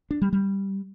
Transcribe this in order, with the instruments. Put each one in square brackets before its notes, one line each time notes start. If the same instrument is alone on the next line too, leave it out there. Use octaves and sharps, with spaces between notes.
[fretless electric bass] D4
G3
G3